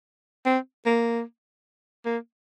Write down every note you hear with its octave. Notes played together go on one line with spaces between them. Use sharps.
C4
A#3
A#3